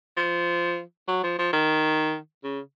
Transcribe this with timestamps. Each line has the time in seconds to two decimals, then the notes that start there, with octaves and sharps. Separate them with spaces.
0.17 F3
1.08 F#3
1.23 F3
1.38 F3
1.53 D#3
2.44 C#3